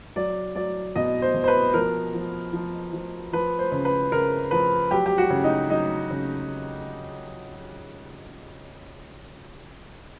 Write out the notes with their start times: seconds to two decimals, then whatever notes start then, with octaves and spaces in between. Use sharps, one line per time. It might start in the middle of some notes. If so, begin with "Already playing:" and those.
0.16 F#3 D5
0.55 F#3 D5
0.96 B2 D#5
1.22 C5
1.34 B2
1.44 C5
1.48 B4
1.74 F3 A#4
2.14 F3
2.53 F3
2.93 F3
3.33 F3 B4
3.59 C5
3.72 C#3
3.85 B4
4.12 C#3 A#4
4.51 F3 B4
4.91 F#3 G4
5.06 G4
5.18 F#4
5.30 C#3
5.44 D#4
5.70 F#3 D#4
6.11 C#3